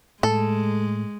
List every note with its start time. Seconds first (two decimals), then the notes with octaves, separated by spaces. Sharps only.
0.23 A2 G#3 A4